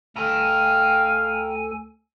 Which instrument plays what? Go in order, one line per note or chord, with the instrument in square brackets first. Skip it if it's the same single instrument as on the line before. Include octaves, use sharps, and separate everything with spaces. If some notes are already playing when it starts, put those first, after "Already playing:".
[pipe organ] D2 A4 G#5 [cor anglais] F5 [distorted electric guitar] G5 A#5